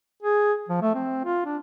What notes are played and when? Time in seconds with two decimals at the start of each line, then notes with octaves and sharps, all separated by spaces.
0.23 G#4
0.69 F3
0.82 A3
0.95 C4
1.25 F4
1.46 D4